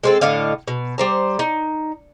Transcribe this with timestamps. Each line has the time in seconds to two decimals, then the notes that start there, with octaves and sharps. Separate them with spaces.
0.03 G#3 C4 A4
0.21 A2 D3 D#5 F5
0.68 B2
0.98 G3 C5 A#5
1.39 D#4